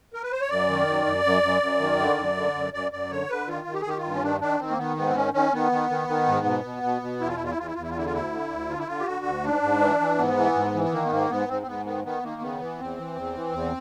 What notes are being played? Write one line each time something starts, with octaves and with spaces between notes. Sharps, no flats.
A#4
B4
C5
C#5
F#2 D5
D#3
F#2
F#2
F#2
F#2
F#2
D#3
D3
F#2
D3
F#2
F#2 D5
F#2 D5
D3 C#5
D3 B4
D#3 F4
D#3
G4
G#4
D#3 G4
F4
G2
C#4
D#3 D4
D#3 D4
D#3 C4
A#3
D#3 B3
G#2 B3
C4
D#3 C#4
D#3 C#4
D#3 B3
D#3
D#3
D#3
G#2
B2
B2
B2
B2
E2 E4
F4
E4
E2 F4
E4
E2 F4
E4
E2 F4
E4
F4
D3 E4
F4
D2 E4
D3
D2
D3 F4
E4
D3 F4
G4
D3 F#4
D2
G#2 D4
G#2
E3
E3
G#2 B3
E3
G#2
E3
B3
D#3 A#3
B3
G#2 A#3
G#2 B3
G#2 C4
C4
G#2 B3
D#3 B3
D#3 B3
D#3 A#3
C#3 B3
E3
E2 C4
E3
E2
E3
E2